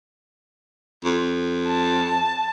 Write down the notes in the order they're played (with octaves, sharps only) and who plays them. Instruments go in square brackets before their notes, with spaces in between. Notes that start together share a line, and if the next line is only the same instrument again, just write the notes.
[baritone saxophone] F2
[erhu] A5